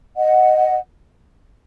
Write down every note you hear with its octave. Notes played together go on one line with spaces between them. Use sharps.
D#5 F#5